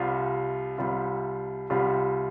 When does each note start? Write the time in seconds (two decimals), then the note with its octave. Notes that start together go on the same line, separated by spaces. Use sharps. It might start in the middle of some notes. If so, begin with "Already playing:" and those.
Already playing: C2 C3 G3 F4
0.78 C2 C3 G3 F4
1.70 C2 C3 G3 F4